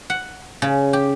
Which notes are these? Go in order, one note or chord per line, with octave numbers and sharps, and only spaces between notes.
F#5
C#3
G4